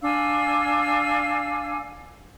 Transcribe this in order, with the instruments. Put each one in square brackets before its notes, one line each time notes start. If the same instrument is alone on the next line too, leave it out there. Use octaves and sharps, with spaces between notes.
[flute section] D4 F5 G#5 E6